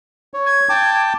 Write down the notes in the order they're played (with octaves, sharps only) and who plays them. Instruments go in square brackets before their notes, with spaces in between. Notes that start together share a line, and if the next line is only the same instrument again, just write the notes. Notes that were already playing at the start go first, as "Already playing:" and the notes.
[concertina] C#5
[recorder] G#6
[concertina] G5 A5 D6